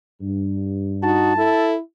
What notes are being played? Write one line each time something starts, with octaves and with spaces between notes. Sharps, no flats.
G2
D#4 F#4 A5
E4 A4